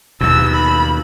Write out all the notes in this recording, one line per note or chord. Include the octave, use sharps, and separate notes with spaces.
D#2 B2 E6
B5